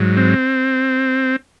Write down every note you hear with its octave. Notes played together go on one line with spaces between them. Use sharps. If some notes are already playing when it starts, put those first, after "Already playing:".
Already playing: G#2 F#3
C4